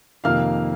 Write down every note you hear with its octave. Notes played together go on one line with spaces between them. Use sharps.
F2 C3 D#3 A#3 F5 F6